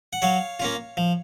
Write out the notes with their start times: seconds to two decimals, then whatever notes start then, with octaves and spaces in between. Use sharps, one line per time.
0.13 F#5
0.22 F#3 C#5 F5
0.60 A#3 C#4 F4
0.97 F3